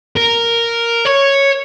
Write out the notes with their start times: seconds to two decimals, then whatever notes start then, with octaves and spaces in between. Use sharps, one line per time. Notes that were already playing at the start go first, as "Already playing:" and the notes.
0.16 A#4
1.06 C#5